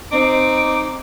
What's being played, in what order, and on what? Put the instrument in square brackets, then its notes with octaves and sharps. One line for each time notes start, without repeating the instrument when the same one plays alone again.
[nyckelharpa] C4 [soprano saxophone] D#4 [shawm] D6 [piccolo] D7